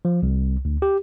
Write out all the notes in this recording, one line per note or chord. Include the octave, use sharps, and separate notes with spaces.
F3
C2
D2
G4